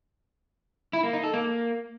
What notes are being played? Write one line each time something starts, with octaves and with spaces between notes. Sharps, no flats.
E4
A#3
D#4
A4
A#3